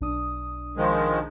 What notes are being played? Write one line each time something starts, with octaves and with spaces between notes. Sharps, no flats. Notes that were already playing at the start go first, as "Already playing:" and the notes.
B1 D4 D#6
D#3 F3 G#3